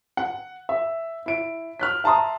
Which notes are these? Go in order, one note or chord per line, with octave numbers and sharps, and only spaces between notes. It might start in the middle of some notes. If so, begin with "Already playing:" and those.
F#5
E5
E4 D7
F6 F#6 B6
E5 A5 A#5 C6 D#6